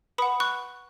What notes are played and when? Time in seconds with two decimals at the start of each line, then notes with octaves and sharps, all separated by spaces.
0.18 B4 F#5 B5 D#6
0.40 C#6 F#6